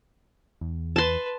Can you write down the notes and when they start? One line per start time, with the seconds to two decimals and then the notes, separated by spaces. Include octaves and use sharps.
0.61 E2
0.96 B4 A5 C6